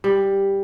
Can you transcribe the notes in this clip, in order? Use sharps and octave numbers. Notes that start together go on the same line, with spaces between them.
G3